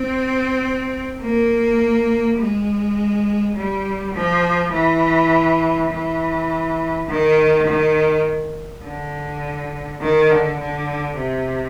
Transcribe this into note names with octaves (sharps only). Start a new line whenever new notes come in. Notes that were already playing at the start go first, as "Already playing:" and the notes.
Already playing: C4
A#3
G#3
G3
F3
E3
E3
D#3
D#3
D3
D#3
D3
D3
C3